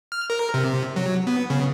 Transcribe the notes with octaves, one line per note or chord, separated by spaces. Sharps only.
F6
A#4
C3
F#3
B3
C#3